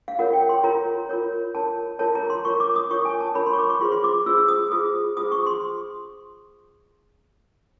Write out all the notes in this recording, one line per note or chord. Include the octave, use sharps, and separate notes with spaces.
F5
F4 A#4 C#5 F#5
G5
C6
F4 A#4 C#5 A#5
F4 A#4 C#5
F4 A#4 C#5 A5
F4 A#4 C#5 A5
A#5
C6
F4 A#4 C#5 C#6
D6
D#6
F4 A#4 C#5 C#6
G#5
A5
F4 A#4 C#5 B5
C6
C#6
D6
C#6
F4 G#4 C5 C6
C6
D6
F4 G#4 C5 E6
E6
D#6
F4 G#4 C5 D#6
F4 G#4 C5 D#6
C#6
C6